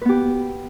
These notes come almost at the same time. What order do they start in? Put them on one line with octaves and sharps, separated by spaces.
B4 B3 G4